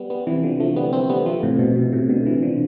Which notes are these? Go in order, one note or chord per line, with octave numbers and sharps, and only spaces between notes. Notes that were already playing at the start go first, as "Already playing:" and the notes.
Already playing: G3 B3
G3 B3
C3 E3
D3 F3
F3 A3
G3 B3
A3 C4
G3 B3
F3 A3
A2 C3
B2
B2
A2 C3
B2 D3
C3 E3
D3 F3